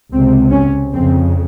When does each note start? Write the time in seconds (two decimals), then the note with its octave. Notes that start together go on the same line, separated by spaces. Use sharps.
0.12 C#2 C3 C4
0.51 C#4
0.92 F2 C#3 C4